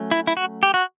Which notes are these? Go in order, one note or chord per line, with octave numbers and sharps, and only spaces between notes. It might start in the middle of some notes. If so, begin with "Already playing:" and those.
Already playing: F#3 A3 C#4
E4
E4
F#4
G4
F#4